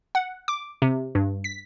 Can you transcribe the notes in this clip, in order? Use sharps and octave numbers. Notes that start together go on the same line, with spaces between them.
F#5
D6
C3
G2
B6